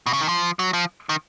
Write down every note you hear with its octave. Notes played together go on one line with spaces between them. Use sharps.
B2
C#3
D#3
F3
F#3
F3
D#3